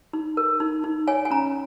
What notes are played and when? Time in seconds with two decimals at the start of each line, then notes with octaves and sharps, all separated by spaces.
0.13 D#4
0.37 A#4
0.60 D#4
0.84 D#4
1.07 C#5 G#5
1.25 G#5
1.31 C#4 A#5